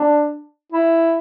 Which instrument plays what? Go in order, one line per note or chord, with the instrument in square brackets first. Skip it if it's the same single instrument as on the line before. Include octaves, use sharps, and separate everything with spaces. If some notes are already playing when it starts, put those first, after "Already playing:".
Already playing: [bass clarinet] D4
E4